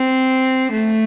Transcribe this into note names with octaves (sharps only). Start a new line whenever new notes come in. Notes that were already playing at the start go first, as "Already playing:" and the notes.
Already playing: C4
A3